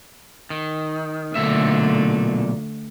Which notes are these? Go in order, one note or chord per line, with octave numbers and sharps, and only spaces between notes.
D#3
B1 A#2 D3 A3 E5